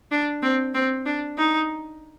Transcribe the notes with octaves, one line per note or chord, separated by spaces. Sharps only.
D4
C4
C4
D4
D#4